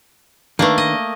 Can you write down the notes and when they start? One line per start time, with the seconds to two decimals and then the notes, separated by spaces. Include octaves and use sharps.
0.59 D#3 A3 A#3 D4 B4
0.78 D#5